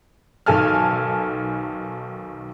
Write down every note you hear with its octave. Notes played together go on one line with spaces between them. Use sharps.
B1 D#3 A4 G#5 A5 F6